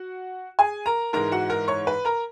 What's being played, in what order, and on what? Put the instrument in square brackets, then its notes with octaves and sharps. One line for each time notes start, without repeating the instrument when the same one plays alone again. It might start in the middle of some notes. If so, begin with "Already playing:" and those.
Already playing: [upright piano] F#4 F#5
G#4 G#5
A#4 A#5
G#2 E3 G#3 A#4 A#5
F#4 F#5
A#4 A#5
C#5 C#6
B4 B5
A#4 A#5